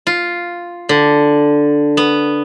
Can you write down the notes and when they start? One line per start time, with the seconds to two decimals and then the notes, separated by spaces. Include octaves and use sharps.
0.07 F4
0.89 D3
1.97 B3